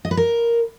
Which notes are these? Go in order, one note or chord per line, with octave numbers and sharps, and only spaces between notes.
D#5
B4
A#4